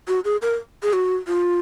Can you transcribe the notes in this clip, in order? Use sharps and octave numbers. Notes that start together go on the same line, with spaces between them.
F#4
G#4
A#4
G#4
F#4
F4